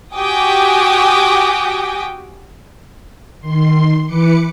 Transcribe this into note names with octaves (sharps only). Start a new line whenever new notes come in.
F#4 G4 G5 G#5 D6 D#6
D#3 C6
E3 B4 D6 C#7